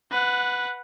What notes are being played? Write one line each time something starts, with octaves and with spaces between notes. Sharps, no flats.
B4 F#5